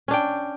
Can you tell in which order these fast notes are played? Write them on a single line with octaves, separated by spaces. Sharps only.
C#4 D4 G5